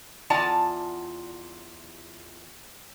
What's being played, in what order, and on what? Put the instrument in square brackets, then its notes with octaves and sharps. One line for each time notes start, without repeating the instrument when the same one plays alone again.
[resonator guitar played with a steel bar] E2 F4 D5 F#5 A5 A#5